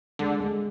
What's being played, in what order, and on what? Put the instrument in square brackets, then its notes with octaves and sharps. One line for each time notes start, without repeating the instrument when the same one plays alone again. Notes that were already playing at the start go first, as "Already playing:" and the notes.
[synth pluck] D3 [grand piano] G#3
[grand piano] G#3